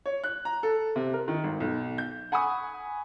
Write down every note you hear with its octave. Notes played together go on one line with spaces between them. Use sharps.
C#5
F#6
A#5
A4
C3
A#4
D#3
G#1
B1
G6
F#5 G#5 B5 C#6 D#6